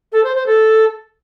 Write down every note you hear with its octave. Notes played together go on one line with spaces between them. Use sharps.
A4
C5
C5
A4